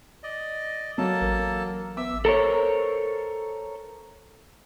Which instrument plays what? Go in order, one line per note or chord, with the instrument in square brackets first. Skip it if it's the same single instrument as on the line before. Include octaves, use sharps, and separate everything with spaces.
[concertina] D5 D#5
[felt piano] F#3 [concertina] A#3 A4 A5
[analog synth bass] A1 [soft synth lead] A#4
[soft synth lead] B3 [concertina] E5 E6 [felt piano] D6
[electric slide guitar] A4 A#4 C5 C#5